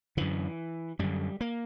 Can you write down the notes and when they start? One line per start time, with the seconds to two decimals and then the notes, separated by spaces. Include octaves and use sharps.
0.17 F#2 D3 E3
0.99 F#2 D3 G3
1.41 A#3